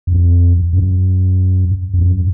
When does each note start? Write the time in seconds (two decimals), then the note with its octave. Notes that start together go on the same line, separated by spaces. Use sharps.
0.07 F2
0.73 F#2
1.94 F2
2.05 F#2